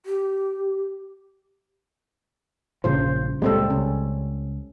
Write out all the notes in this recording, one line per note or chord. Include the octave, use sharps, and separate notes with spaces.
G4
A#1 G2 C#3 F3 C5
C#2 A#2 G3 G#3 C4 A4
C#2 C#4